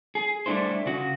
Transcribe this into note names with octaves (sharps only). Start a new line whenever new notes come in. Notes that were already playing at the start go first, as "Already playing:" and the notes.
G#4
G3 A3 D4 E4 C5
C#3 F#4